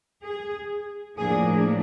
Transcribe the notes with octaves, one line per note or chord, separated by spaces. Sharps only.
G#4
A2 F3 A#3 D4 G#4